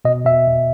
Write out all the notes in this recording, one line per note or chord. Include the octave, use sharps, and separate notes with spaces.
B2 D#5
B2 E5
B2